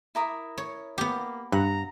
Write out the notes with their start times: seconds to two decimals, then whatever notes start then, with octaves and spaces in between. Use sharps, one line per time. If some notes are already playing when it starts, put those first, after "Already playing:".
0.15 E4 A#4 D#6
0.58 C#5
0.98 A#3 B3 G4
1.52 G2 F#5 A#5